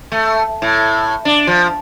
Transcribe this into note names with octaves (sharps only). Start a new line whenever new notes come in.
A3
A2
D4
F3